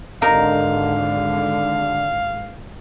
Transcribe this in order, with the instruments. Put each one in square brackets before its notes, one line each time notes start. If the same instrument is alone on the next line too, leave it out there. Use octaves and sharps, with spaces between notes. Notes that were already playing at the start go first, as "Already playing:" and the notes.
[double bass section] G#1 [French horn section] D3 [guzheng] D#4 A#4 [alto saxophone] F5